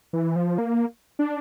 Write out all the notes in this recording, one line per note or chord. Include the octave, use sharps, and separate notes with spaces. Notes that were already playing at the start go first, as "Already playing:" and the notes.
E3
F3
A#3
D4